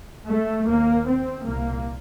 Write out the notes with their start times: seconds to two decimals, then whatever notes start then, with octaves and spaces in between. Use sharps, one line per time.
0.27 A3
0.66 D#2 A#3
1.06 C4
1.45 C2 A#2 A#3